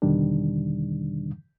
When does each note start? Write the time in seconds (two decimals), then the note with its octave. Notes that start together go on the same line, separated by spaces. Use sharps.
0.02 E2 B2 D3 D#3 G3 D4